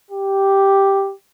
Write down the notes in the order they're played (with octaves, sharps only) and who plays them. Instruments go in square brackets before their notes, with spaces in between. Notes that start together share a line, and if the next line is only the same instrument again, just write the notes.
[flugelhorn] G4